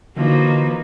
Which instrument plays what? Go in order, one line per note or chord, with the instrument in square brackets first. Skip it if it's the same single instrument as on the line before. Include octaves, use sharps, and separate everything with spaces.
[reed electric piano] D3 E3 [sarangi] F3 [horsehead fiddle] A#3 [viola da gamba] D#4 F#4 B4